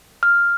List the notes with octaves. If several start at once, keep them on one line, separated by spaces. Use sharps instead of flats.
F6